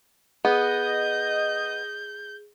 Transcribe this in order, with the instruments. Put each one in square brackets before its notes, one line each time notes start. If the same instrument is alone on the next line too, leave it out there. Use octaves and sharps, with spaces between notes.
[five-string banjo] B3 [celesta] G#4 [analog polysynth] D#5 [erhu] G6